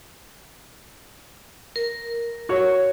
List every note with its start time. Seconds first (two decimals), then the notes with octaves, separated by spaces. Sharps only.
1.76 A#4
2.49 F#4 C#5